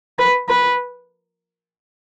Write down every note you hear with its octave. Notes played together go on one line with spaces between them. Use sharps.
B4
B4